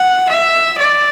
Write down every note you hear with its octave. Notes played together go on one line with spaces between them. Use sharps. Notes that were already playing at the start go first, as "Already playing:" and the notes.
Already playing: F#5
E5
D5